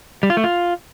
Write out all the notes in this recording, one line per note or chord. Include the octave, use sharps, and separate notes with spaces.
G3
F4
A3
F4